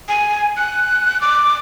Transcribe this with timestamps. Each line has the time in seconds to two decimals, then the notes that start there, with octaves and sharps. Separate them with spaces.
0.09 G#5
0.57 F#6
1.21 D6